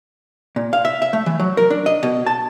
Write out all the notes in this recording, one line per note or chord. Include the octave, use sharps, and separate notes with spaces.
A#2
F5
E5
E5
A3
E3
F#3
A#4
D4
D#5
B2
A5